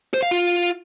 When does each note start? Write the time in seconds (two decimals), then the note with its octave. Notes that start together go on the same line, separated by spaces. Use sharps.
0.14 C5
0.23 F5
0.31 F4